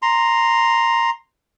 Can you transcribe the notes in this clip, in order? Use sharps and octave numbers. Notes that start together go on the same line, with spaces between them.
A#5 C6